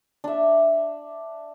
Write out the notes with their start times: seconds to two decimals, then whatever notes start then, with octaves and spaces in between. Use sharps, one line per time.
0.24 D4 E5